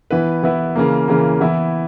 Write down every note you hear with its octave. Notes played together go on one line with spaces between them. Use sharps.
E3 B3 E4 B4
E3 B3 E4 B4
C#3 E3 A#3
C#3 E3 A#3
E3 B3 E4